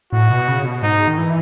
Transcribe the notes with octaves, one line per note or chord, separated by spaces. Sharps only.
A2 F#4
B2
C#3
B2
G#2 D#4
D#3
E3